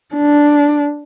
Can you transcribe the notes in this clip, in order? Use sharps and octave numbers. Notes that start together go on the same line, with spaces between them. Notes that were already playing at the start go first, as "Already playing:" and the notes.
D4